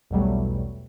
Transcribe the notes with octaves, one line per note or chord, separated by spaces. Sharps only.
B1 E2 B2 F#3 G3 A3